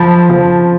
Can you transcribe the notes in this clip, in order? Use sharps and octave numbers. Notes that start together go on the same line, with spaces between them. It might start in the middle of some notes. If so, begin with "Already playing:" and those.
Already playing: F3 A5 B5
F3